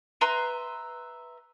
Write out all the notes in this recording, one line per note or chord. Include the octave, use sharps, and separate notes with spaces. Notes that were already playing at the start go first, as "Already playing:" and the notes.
B4 E5 A#5 C6